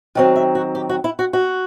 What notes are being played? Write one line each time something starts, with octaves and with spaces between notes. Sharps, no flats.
D#3 F#3 C4 F#5
E5
F#4
G4
F#4
E4
F#4
F#4